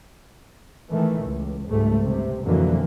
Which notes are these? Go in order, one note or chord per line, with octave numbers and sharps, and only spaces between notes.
D#3 E3 A3
C#2
C#2 G#2 G3 A3
G1 C3
F2 B2 D3 E3 F#3 A#3